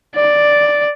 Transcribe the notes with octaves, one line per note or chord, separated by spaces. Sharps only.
D5